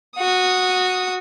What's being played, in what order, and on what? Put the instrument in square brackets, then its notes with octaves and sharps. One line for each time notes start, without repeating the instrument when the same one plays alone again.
[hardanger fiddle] F#4 D#6